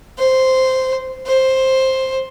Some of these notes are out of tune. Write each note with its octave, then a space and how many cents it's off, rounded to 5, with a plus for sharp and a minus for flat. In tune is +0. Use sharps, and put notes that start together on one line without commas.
C5 -5
C5 +10